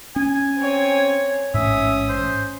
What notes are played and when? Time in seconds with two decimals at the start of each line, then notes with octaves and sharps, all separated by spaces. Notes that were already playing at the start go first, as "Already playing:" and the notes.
0.16 C#4 G#5
0.57 C4 C#5
1.54 A1 G#2 C#4 E5 D#6
2.09 C5